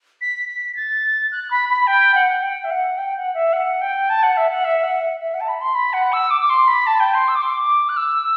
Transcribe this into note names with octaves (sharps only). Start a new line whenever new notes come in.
B6
B6
B6
A6
F#6
B5
B5
G5
F#5
G5
E5
F#5
G5
F#5
E5
F#5
G5
A5
F#5
E5
F#5
E5
F#5
E5
E5
F#5
A5
B5
C6
B5
F#5
E6
D6
D6
C6
B5
A5
G5
C6
E6
D6
C6
D6
F#6
E6